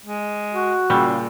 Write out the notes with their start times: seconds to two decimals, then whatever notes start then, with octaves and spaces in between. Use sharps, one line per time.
0.05 G#3
0.53 F#4
0.90 A#2 C#3 G3 C#6 E6